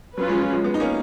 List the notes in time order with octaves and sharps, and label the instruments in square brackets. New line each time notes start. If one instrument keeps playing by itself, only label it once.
[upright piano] F#3 [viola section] C#4 F4 B4
[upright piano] F3 G#3
F3
F3 G#3
G#3 B3
D#4
A#3 C#4